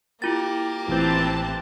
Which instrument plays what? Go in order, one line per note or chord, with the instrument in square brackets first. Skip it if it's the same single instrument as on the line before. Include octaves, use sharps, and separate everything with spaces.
[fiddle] A#3 G4 [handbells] E4 F4 A6
[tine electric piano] A1 A2 G6 [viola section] E3 C4 A5